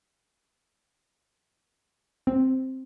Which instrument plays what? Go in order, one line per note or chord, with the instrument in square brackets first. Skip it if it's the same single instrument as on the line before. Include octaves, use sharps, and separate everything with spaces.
[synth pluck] C4